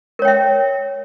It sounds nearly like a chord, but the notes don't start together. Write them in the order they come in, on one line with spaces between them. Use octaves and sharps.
A#4 C#5 G5 E5